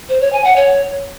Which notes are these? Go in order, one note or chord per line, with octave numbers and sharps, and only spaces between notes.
C5
C#5
G#5
F#5
C#5